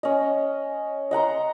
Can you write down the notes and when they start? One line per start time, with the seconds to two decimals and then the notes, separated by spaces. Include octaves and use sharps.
0.03 C#4 D#5
1.11 D#5 F#5 A#5 C6